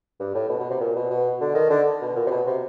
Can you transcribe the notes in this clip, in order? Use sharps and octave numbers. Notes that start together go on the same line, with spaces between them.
G2
A2
B2
B2
C3
A#2
B2
B2
D3
D#3
D3
B2
A#2
C3
B2
C3